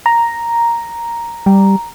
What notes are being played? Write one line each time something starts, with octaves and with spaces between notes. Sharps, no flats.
A#5
G3